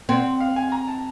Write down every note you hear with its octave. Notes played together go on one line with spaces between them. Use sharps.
C4 F#5
F5
G#5
A#5
A5